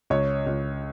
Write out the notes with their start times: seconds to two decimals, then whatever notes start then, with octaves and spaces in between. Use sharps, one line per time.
0.10 C#2 C#5
0.47 C#2